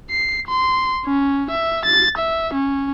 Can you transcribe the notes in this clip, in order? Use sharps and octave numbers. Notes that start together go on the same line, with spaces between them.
C7
C6
C#4
E5
A6
E5
C#4